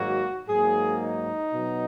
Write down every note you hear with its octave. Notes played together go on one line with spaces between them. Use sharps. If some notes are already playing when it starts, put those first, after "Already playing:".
Already playing: G#2 D#3 F#3 A#3 F#4
G#2 F#3 A#3 G#4
D#4
B2 F#3